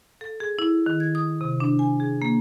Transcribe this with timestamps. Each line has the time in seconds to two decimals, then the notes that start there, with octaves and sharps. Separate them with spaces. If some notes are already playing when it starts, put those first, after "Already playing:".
0.21 A4
0.40 G#4
0.59 E4
0.86 D#3
1.00 G#6
1.15 D#6
1.41 C3
1.60 D4
1.79 G#5
2.00 G#4
2.22 A#3